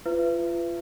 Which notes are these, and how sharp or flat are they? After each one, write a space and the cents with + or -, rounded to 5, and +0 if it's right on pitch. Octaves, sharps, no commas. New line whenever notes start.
F4 -25 B4 +20 E5 +35